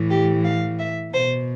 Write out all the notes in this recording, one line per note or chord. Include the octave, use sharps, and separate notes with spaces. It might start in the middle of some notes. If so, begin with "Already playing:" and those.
Already playing: A2 E3
G4
F5
E5
B2 C5